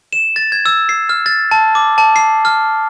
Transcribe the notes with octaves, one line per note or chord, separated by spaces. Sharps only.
E7
A6
G#6
E6
C7
F6
A6
A5
D6
A5
C7
F6